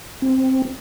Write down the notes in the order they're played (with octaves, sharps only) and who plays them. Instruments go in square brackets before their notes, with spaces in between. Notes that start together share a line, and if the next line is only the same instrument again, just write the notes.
[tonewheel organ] C4